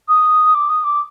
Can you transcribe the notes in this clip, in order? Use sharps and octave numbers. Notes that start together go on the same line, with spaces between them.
D#6
D6
D#6
D6